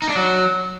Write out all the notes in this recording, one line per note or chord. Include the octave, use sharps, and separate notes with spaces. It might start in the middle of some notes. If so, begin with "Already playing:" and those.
D#4
D4
F#3